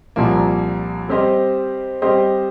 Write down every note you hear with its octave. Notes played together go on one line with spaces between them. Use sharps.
C2 A#2 F3 A#3
G3 C4 G4 C5 D#5
G3 C4 G4 C5 D#5